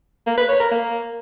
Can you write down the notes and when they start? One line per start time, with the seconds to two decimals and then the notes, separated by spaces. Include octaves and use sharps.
0.26 A#3
0.38 B4
0.49 C#5
0.60 A#4
0.71 A#3